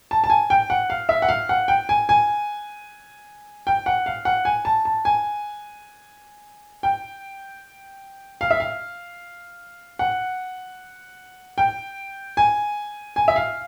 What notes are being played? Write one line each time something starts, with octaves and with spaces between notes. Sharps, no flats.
A5
A5
G#5
G5
F#5
F5
E5
F#5
F5
F#5
G5
G#5
G#5
G5
F#5
F5
F#5
G#5
A5
A5
G#5
G5
F5
E5
F5
F#5
G5
G#5
G#5
E5
F5